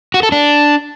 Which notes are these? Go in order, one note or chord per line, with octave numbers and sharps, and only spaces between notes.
F#4
A4
D4